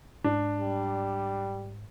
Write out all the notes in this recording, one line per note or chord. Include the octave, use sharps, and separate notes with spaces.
G#2 D4
G3